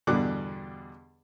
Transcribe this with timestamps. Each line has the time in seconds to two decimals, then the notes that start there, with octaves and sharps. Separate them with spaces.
0.07 E2 G2 B2 D3 D6 F#6